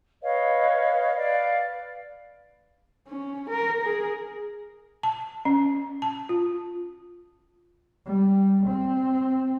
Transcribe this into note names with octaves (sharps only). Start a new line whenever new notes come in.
B4 C#5 D#5 F5
B4 D5 F5
C#4
A#4
G#4 A#4
A5
C#4
A5
F4
G3
C4